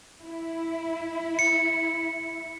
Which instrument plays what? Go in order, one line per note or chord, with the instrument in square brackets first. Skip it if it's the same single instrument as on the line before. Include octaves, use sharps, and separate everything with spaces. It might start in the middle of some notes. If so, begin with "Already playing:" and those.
[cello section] E4
[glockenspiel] C#7